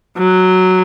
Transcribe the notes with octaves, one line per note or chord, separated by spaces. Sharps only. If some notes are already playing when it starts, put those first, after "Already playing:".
F#3